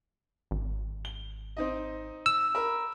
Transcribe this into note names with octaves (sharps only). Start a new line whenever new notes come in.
G#1
G7
C4 D#4 D#5
E6
A#4 B5